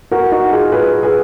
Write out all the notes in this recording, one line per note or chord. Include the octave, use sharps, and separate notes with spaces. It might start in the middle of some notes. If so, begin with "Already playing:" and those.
F#4 A#4
D#4 F#4
F4 G#4
G#4 B4
G#4 B4